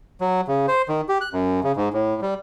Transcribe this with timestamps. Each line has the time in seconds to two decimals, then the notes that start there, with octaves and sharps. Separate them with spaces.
0.21 F#3
0.48 C#3
0.68 C5
0.89 D#3
1.09 G4
1.21 F#6
1.33 F#2
1.64 C#3
1.76 G#2
1.94 A2
2.22 G3